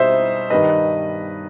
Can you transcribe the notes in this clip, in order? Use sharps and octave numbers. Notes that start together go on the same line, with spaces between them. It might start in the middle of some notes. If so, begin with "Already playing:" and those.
Already playing: B2 G3 D#4 C5 E5
G2 D#3 G3 D#4 B4 D#5